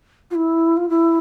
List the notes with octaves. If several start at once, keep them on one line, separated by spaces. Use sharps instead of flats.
F4
E4
F4
E4